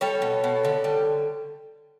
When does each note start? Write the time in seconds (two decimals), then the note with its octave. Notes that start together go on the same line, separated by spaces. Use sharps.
0.01 G3 A4 C#5
0.22 B2
0.44 B2
0.65 D3
0.84 G3